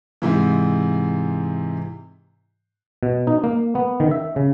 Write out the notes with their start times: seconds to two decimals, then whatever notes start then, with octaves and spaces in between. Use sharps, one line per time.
0.22 G#2 C3 E3
3.03 B2
3.27 D#4
3.44 A#3
3.75 B3
4.00 D#3
4.11 E5
4.36 C#3